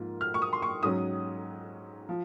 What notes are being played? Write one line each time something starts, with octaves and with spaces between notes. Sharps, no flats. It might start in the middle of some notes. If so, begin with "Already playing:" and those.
Already playing: G#2 F3 A#3 F4
F6
C#6
D#6
C6
C#6
G#2 F#3 C#4 D#6
F3